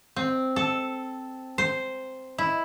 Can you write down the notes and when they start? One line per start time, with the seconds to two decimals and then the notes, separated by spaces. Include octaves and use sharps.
0.16 C4
0.56 A4
1.58 C5
2.38 E4